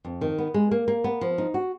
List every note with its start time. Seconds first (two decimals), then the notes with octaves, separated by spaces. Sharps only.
0.05 F2
0.21 D#3
0.38 B3
0.54 G#3
0.71 A#3
0.88 A#3
1.04 B3
1.21 F3
1.38 D#4
1.54 F#4